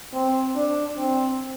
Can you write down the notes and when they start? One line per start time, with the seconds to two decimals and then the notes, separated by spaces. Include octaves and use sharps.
0.13 C4
0.55 D4
0.97 C4